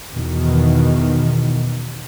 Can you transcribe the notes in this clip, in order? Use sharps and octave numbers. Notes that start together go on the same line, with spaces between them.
E2 B2 D#3